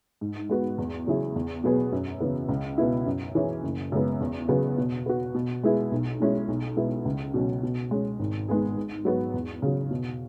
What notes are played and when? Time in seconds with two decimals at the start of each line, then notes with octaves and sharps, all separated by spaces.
0.21 G#2
0.49 G#3 B3 F#4
0.78 E2
1.07 C#3 F#3 E4 G#4
1.36 E2
1.64 B2 F#3 B3 G#4
1.92 F#2
2.20 C#3 E3 B3
2.49 C#2
2.78 B2 B3 E4
3.06 F#2
3.35 E3 C#4 G#4
3.63 F#1
3.92 F#2 C#3 G#3 B3
4.21 E2
4.49 C#3 F#3 B3 G#4
4.78 B2
5.06 B3 F#4
5.34 B2
5.63 G#3 B3 E4 G#4
5.92 B1
6.20 B2 G#3 C#4 E4
6.48 B1
6.77 B2 G#3 B3 E4
7.05 C#2
7.34 B2 F#3 C#4
7.63 B2
7.91 G#3 C#4
8.19 G#1
8.48 G#2 G#3 B3 G#4
8.77 G#2
9.05 F#3 B3 F#4
9.34 E2
9.62 C#3 F#3
9.91 B2